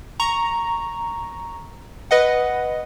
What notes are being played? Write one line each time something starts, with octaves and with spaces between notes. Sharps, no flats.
A#5 C#6
B4 D#5 F#5